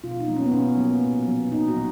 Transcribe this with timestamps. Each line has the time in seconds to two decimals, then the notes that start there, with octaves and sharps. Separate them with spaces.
0.04 B2 F4
0.20 D#4
0.28 F#3 A#3
0.37 C#4
0.46 B3
0.53 B2 C#4
0.78 F#3 A#3
1.03 A#2
1.27 F#3 B3
1.52 A#2 D#4
1.68 F#4
1.76 F#3